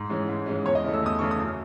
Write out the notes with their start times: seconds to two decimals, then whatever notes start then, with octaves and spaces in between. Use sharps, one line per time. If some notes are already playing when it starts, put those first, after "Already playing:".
Already playing: G#2
0.10 E3 G#3 C#4
0.29 G#2
0.46 E3 G#3 C#4
0.66 E2 C#5
0.75 D#5
0.84 C#3 E3 A3
0.93 E6
1.03 E2 D#6
1.19 C#3 E3 A3 C#6
1.31 D#6
1.39 F#2